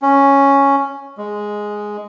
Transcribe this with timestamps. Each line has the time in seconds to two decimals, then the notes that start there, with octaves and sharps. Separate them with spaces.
0.02 C#4
1.18 G#3